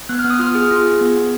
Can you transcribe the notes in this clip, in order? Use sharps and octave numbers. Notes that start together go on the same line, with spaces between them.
B3 F#6
F6
B3
D#6
F4 F6
G#4
F4
G#4
B3
B3